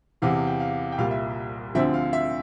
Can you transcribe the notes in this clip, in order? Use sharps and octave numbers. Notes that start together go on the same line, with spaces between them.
E2 C3 E3 F5
F5
G5
F5
G5
C2 A#2 G3 F5
E5
D2 D3 F3 C4 E5
F5
E5